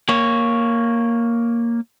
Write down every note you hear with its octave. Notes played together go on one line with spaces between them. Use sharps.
A#3 C#5